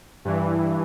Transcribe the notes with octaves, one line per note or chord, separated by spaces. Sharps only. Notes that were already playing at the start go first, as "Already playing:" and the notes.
G2 E3